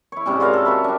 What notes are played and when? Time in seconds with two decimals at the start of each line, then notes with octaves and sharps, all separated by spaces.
0.12 E4 C#5
0.26 G#2 C3 G3 C#4
0.40 F4 F#4 A#4 F5
0.53 A4
0.65 F#4 A#4 E5 B5
0.84 G3 D4